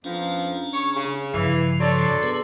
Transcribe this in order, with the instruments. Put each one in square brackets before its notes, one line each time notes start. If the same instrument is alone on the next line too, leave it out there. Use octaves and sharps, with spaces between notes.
[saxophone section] F2 F3 B3 [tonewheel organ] C#4 D4 A#5
[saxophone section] C#3 C#5
C#3
[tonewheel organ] G2 C#3 F3 [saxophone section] E3
[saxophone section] F#3 D4 [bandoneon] A4 D5 C6
[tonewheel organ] B3 G#4 B4